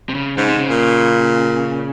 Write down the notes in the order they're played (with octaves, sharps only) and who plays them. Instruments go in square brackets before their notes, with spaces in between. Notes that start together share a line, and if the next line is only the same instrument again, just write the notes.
[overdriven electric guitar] C3
C#3
[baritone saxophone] G#2 [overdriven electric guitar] C#3
[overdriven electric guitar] C3
C#3
[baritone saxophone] A#2